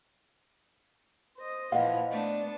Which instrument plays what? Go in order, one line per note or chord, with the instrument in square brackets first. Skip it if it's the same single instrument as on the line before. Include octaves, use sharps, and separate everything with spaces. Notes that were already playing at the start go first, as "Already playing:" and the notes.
[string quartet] C5 D#5
[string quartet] A#2 E3 F3 [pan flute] D#5 [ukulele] F5 F#5
[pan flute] A3 [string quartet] B3 D4 A5